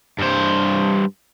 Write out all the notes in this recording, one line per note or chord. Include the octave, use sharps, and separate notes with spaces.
G2 C5